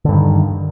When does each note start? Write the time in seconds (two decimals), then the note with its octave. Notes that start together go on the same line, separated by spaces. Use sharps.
0.05 D3
0.09 G2
0.13 D#3